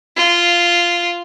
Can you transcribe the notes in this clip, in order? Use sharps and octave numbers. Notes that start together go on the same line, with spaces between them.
F4